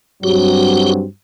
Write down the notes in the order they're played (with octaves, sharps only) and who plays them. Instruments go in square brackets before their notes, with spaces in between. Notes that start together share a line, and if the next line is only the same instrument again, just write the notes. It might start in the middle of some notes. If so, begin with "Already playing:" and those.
[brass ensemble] G2 F#3 C4 [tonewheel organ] F#4 G4